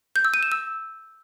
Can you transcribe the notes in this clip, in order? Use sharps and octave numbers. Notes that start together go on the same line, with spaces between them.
G6
E6
D#7
E7
E6